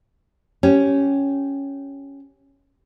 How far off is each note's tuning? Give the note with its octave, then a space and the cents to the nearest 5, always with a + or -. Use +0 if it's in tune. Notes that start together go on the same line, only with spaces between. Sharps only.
C#4 +0 G4 -10